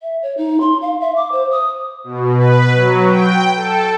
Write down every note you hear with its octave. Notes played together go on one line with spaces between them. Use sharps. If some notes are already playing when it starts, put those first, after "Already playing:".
E5
C#5
D#4
C6
F5
E5
D6
C5
D#6
B2
B4
F#3
G5
A4